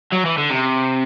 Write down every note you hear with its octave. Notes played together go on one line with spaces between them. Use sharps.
F#3
E3
D3
C3